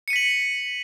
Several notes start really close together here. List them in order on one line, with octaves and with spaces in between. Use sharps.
C#7 D#7 B6 F#7